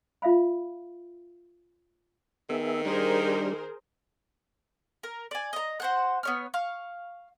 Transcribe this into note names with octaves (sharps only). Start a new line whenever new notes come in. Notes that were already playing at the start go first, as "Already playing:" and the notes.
F4 E5 F5 B5
D#3 B3 G#4 E5
G3 D4 G#4 A#4 C5
A#4
D5 G#5
D#5 A#5
F#4 C5 F#5
B3 C#5 F6
F5 C#6